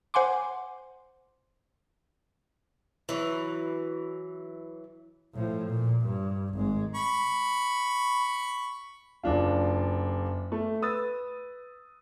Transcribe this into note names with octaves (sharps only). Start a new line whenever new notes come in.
C5 F#5 G#5 C6 D6
E3 F#3
A2 F3
A#2
G2
G#1 G#3
B5 C#6
F#1 D4 F4
A3
B4 D#6 E6 A6